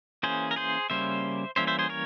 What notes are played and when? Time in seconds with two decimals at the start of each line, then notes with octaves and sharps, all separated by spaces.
0.23 E3 A#3 C#4 G#4 C5
0.51 A#4
0.56 G#4 C5
0.90 C#3 G3 A#3 C#4 C5 E5
1.56 E3 G3 A#3 C#4 C5 E5
1.67 C5 E5
1.79 G#4 C5
1.89 A#4 C#5